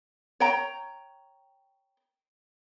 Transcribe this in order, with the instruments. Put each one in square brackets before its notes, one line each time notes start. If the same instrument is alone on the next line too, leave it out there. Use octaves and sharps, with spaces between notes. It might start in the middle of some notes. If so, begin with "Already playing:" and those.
[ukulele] C#5 G5 A#5